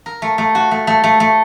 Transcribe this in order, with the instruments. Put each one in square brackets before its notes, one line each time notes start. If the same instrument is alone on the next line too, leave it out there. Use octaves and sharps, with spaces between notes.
[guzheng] A#4
A3
A3
F#4
A3
A3
A3
A3